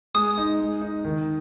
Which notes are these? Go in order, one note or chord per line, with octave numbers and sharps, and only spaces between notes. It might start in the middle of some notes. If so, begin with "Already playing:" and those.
G#3 D#6
D#4
G#3
D#4
D#3